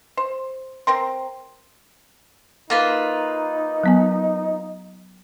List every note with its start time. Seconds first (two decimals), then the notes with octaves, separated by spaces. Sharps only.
0.17 C5
0.87 C4 A#4 C6
2.70 A#3 D#4 F4 B4
3.83 F#3 B3 G#5